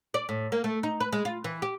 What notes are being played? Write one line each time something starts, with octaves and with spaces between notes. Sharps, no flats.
D5
A2
A#3
A3
D#4
B4
G#3
F4
E3
G4